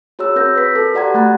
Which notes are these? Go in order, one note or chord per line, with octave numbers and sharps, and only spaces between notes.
F#4 G#4 C#5 A#5 E6
C4 A#4 E6 G6 A#6
B4 B6
A4
F#4 G4 D5 F#5 A#5 G#6
A3 B5 F#6 A6